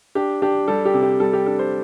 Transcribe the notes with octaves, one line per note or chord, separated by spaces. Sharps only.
D4 G4
D4 G4
G3 A4
G4
C3
G4
G3 A4
G4
D4 A4
C5